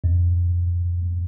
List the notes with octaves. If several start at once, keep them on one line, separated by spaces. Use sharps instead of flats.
F2